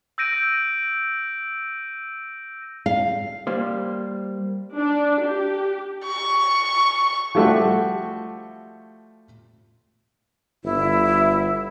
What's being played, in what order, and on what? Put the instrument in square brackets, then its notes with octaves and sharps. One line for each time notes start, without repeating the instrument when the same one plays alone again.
[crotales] E6 G6 A#6 D7 D#7
[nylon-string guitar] F5
[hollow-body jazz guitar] G3 A#3 C5
[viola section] D4
G4
[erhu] C#6
[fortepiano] F3 G3 A3 F#4 G4
[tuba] G1 [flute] E4